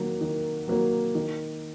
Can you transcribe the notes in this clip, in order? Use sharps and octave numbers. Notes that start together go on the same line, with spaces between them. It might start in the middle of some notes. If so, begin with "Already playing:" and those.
Already playing: D#3 F#3 A#3
D#3
F#3 A#3
D#3